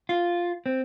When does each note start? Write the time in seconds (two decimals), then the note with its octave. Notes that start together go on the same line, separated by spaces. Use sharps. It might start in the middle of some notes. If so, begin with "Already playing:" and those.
0.09 F4
0.66 C4